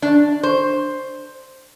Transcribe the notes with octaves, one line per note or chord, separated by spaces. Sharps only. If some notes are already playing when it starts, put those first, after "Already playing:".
D4
C5